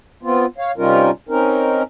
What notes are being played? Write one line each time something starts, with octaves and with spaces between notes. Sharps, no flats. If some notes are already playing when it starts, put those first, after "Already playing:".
B3 C4 F4
C#5 F5
C3 G3 C#4 D#4 F4 A#4
C4 C#4 D#4 A#4